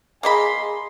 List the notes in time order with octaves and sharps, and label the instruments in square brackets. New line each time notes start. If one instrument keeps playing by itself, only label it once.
[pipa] A#3 D#5 B5 [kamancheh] G#4 C6